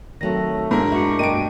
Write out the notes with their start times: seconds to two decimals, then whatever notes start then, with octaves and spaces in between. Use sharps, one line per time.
0.21 D#3 F#3 A3 C4 A#6
0.71 G#2 D4 E4 A#4
0.92 D4 F#4 E5 C#6 C#7
1.19 G2 B2 A3 A#4 D#5 G5 D7 D#7